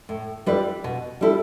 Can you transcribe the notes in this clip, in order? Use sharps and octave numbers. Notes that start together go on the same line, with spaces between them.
A2
G3 E4 B4 D5
B2
G3 E4 A4